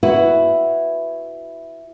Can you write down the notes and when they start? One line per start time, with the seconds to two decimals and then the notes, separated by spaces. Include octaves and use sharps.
0.03 E4 F#4 B4